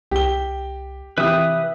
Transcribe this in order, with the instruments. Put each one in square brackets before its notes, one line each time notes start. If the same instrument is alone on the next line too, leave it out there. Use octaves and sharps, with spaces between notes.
[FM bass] C2 [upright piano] G4 G7
[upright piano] C3 [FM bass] E3 [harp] E4 G4 E5 [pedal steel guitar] B4 D#6